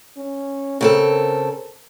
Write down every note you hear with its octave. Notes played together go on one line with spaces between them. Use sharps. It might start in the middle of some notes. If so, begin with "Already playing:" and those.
C#4
C#3 C4 A4 A#4